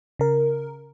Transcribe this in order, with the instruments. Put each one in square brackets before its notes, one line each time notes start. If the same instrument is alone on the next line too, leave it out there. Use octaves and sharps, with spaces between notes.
[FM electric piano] C#3 A#4